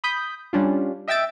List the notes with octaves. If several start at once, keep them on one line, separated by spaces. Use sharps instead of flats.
B5 D#6 G6 B6
G3 C#4 D4 F4
D#5 E5 G5 E6 A6 D7